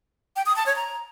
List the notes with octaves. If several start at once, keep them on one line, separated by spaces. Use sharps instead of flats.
G5
D#6
A5
C#5
A#5